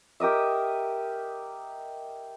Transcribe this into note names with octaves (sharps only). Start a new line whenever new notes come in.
G4 A#4 D#5 E5